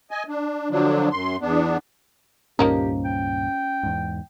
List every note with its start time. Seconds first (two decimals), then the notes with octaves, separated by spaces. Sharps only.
0.11 D#5 G#5
0.28 D4
0.70 D3 F3 F#3 D4
1.11 F#2 C6
1.41 E2 B3 D4
2.59 C#2 G2 A#2 F3 A#3 C#4 D#4 G4
3.05 G5
3.83 E2 G#2